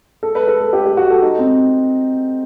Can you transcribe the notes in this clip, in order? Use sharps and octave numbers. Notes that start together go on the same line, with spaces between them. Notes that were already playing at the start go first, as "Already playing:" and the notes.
A4
B4
A4
A4
G4
G4
F#4
A4
D#4
C4